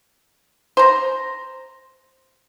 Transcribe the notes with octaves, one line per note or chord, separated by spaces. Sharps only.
C5 A#5